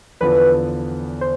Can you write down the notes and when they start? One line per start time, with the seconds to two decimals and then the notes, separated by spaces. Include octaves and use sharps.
0.21 E2 D3 F3 B3 B4
1.21 C5